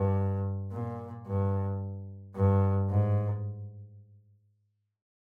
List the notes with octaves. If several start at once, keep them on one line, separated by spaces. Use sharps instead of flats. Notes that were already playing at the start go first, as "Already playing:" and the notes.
Already playing: G2
A#2
G2
G2
G#2